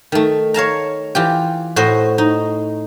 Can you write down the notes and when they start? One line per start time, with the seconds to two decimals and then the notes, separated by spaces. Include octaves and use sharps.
0.12 D#3 A3
0.54 C#5 F5 A5 A#5
1.15 E3 F4 G4
1.76 A2 F#4 C5 D#5
2.18 D#4